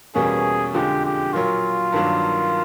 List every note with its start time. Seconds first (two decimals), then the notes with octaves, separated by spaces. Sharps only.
0.14 E2 B2 G3 A#3 C#4 G#4
0.74 F2 D3 F3 G#3 G4
1.04 G4
1.33 A#2 F#3 A#3 F4
1.92 G2 D#3 F#3 A#3 D4